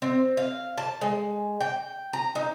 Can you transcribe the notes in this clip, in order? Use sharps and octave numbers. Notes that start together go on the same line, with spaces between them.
C4
F5
A5
G#3
G5
A#5
D#4